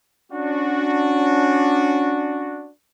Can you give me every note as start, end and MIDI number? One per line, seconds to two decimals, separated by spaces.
0.32 2.71 61
0.32 2.71 62
0.32 2.71 66